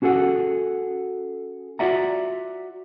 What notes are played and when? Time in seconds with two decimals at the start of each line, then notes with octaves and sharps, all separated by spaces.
0.02 C#4 F#4 G#4 A4 F#5
1.79 F4 F#4 D5 E5 F#5 A#5